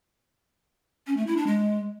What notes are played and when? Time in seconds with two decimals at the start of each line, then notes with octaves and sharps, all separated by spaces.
1.07 C#4
1.17 A3
1.27 E4
1.37 D4
1.47 G#3